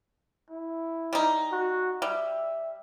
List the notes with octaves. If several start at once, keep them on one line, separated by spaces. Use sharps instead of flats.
E4
G3 D#4
F#4
G3 E5